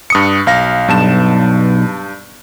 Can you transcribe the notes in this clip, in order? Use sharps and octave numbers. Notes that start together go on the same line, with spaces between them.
G2 D#6 C#7
B1 F5 A#6
B1 G2 A5 E7